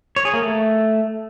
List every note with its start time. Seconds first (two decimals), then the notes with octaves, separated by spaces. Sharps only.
0.16 C#5
0.25 G#4
0.34 A#3
0.42 A3